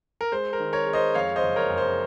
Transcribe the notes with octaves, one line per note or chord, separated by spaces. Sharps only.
A#4
G#3 C5
A#4
D#3
A#4 C#5
G#3
C5 D#5
F2 C#5 F5
C5 D#5
F#1
A#4 C#5
F#1
C5